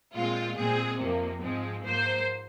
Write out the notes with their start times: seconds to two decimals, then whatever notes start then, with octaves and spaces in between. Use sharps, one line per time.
0.14 A#2 G#3 C4 F4
0.57 A#2 G#3 C4 G#4
0.99 F2 C3 F3 A#3
1.41 G#2 F3 G#3 C4
1.84 G#2 F3 A#3 C5